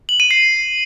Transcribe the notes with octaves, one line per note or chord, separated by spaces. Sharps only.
F#7
D#7
C7